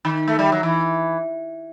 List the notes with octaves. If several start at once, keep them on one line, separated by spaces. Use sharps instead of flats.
D#3
A3
G3
F#3
E3